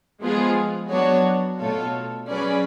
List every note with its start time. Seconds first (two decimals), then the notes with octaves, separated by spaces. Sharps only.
0.22 F3 G#3 B3 F4 G#4
0.91 F#3 B3 D4 F#4 C#5
1.61 B2 A3 F4 A4 C#5
2.30 F#3 C#4 G#4 B4 D5